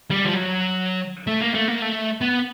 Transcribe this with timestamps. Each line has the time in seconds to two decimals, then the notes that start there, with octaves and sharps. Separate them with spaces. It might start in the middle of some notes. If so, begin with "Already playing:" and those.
0.10 G3
0.25 F3
0.33 F#3
1.27 A3
1.41 A#3
1.54 A3
1.68 A#3
1.82 A3
2.21 B3